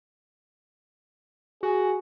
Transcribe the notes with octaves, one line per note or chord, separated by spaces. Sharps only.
F#4 G#4